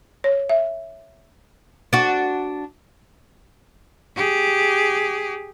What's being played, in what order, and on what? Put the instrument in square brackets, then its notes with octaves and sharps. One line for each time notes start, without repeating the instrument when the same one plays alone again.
[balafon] C#5
E5
[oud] D4 F#4
[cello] G4 G#4